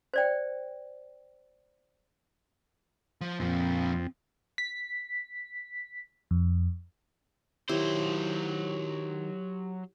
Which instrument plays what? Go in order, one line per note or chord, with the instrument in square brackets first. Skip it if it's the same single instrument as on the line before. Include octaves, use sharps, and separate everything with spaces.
[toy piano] C5 D5 G5
[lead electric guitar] F3
[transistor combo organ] F2 [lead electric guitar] A#2 F3 [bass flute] C4
[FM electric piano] B6
F2
[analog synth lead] D#3 [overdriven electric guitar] F#3 C5 [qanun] E4 [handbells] G4 C#5